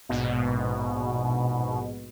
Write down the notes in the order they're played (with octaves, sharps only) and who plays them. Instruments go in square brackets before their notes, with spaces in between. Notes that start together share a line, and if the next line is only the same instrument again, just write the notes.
[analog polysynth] A#1 G#2 B2